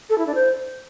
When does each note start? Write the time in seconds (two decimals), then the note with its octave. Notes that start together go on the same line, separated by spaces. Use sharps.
0.09 A4
0.18 E4
0.26 D4
0.35 C5